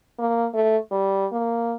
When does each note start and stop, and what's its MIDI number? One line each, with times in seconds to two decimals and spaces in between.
0.19 0.47 58
0.54 0.77 57
0.91 1.26 55
1.32 1.76 58